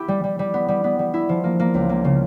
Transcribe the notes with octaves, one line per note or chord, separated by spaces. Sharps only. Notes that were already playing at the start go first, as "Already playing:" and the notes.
Already playing: B3 E4 G4
G3
G3
G3
B3
G3
B3
G3
E4
F3
A#3
A#3
C#2
A#3
C#3